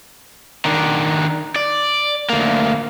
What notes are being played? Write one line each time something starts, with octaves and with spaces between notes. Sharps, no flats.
D#3 D4
D5
D2 A#3